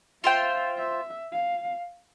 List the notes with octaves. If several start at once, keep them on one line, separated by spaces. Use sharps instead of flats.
F4 C5 E5 G5
E5
F5